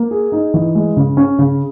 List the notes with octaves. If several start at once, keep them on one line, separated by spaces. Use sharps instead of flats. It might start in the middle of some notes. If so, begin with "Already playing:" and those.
Already playing: A#3
G#4
D#4
E3
G#3
C#3
C#4
C#3